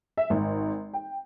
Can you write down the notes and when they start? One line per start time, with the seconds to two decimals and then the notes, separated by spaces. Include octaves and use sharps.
0.17 E5
0.30 G#1
0.94 G5